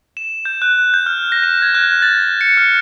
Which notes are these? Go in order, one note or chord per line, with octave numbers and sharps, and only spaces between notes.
E7
G6
F#6
G6
F6
A#6
E7
G#6
F#6
A6
C#7
F6